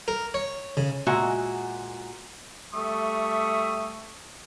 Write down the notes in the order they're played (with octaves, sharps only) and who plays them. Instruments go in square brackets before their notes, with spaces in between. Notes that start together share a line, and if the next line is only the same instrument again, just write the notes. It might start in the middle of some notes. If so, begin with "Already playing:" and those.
[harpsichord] A#4
C#5
C#3
[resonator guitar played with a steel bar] A#2 G#3 F#4 E5 A#5
[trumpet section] G3 A3 E5 C#6 D#6